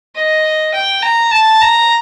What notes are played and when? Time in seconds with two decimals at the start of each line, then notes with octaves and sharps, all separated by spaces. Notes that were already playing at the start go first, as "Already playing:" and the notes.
0.16 D#5
0.74 G5
1.03 A#5
1.31 A5
1.61 A#5